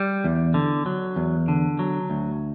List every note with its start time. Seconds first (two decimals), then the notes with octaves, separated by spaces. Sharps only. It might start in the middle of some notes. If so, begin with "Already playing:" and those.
Already playing: G3
0.24 E2
0.54 D3
0.86 F#3
1.16 E2
1.48 D3
1.79 F#3
2.10 D2